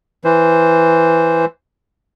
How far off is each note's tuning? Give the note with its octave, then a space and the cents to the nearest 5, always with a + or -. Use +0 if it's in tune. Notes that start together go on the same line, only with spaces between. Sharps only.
E3 +0 C5 +0